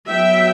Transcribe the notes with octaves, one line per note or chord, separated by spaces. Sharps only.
F#3 B3 E5 G5